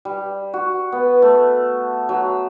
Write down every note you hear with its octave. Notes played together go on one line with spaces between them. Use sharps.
G3
F#4
B3
A3
F#3